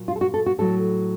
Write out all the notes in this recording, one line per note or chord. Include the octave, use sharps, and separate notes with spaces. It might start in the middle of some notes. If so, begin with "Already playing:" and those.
Already playing: A#2 F#3
F4
A4
F#4
A4
F#4
A2 F#3 A4